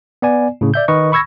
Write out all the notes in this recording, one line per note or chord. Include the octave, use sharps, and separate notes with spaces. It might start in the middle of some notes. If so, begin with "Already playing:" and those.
B3 D5 G#5
A2 C#3
D5 E5 G6
D#3 A#4 B4 D#5 C#6
B5 C#6 E6 G#6 A#6